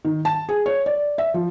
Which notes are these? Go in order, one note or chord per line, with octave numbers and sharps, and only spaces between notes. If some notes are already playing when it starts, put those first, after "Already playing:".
D#3
A5
G#4
C#5
D5
E5
F3